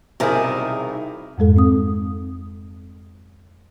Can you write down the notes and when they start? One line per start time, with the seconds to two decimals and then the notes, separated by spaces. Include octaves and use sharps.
0.20 B1 C3 D#3 G3 E4 G#4 A#4
1.38 F2 G#2 G#3 A4
1.57 C4 D#6